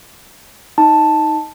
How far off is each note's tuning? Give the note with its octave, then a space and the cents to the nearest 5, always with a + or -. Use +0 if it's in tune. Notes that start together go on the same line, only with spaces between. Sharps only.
D#4 +10 A5 +0